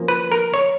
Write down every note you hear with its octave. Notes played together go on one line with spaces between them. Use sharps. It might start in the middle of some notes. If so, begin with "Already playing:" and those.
Already playing: F3 A#3 C#4
B4
A#4
C#5